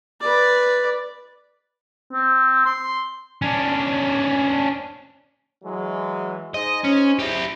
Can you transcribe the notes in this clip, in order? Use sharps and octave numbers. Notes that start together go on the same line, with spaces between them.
B4 D5
C4
C6
C#4 D4
E3 F#3 G#3
D#4 G#4 C5 D#5
C#4
E4 G4